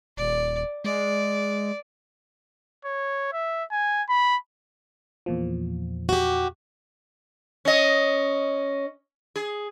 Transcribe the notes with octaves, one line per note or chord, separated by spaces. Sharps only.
D#1 D5
G#3 D5
C#5
E5
G#5
B5
E2 A#2 F3
F#4 G4
C#4 D#5
G#4